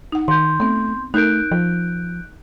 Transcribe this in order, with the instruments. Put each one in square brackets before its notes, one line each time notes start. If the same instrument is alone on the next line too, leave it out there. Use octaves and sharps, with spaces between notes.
[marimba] D#4 F#5
[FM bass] D#3 [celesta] C6 G6
[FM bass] A3 [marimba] B3 C4
[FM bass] A3 [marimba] D#4 A#4 [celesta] F#6 G6 D7
[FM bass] F3